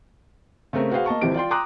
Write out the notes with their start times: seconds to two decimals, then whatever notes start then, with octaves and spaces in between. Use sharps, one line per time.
0.73 C#3 A3 C4 A#4 E5
0.91 F#4 G#4 B4 C5 F5 F#5
1.06 A#3 D#5 A5 C#6
1.21 G#1 C3 E3 F3 G4 D7
1.34 F4 D5 G5 C6
1.51 G5 A#5 C6 D6 D#6 F#6